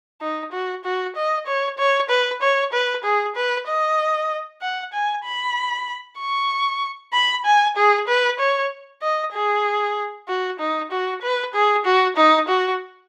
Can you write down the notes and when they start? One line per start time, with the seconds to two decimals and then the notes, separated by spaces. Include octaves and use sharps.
0.21 D#4
0.52 F#4
0.84 F#4
1.16 D#5
1.47 C#5
1.78 C#5
2.10 B4
2.42 C#5
2.73 B4
3.04 G#4
3.36 B4
3.68 D#5
4.62 F#5
4.93 G#5
5.25 B5
6.19 C#6
7.13 B5
7.45 G#5
7.77 G#4
8.08 B4
8.39 C#5
9.02 D#5
9.34 G#4
10.28 F#4
10.60 D#4
10.92 F#4
11.22 B4
11.54 G#4
11.85 F#4
12.17 D#4
12.48 F#4